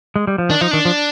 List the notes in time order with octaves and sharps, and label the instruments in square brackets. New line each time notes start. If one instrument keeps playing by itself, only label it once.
[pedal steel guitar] G#3
G3
F3
[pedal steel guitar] D#3 [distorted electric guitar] D4
[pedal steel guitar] F3 [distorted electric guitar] D#4
[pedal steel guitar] D#3 [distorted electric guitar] D4
[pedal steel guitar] F3